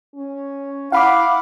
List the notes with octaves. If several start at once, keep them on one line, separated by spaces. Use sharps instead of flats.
C#4
E4 F5 F#5 B5 D6